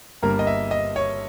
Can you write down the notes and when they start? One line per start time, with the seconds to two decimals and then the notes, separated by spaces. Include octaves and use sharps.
0.22 G1 G2 G3 A#3 A#4
0.39 D#5
0.47 E5
0.71 D#5
0.96 C#5